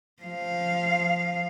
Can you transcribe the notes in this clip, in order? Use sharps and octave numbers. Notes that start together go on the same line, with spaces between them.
F3 F5